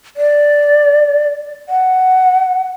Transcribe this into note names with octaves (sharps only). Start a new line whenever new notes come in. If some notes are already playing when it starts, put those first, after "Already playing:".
D5
F#5